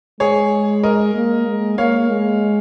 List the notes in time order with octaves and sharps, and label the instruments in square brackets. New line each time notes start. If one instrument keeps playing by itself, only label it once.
[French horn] G#3 [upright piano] G#4 C#5
[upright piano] A#4 D#5
[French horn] A#3
G#3
[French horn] A#3 [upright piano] C#5 F5
[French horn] G#3